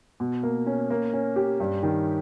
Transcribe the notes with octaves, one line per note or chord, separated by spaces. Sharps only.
B2
A#3
C#4
A#3
C#4
G4
G2
D#3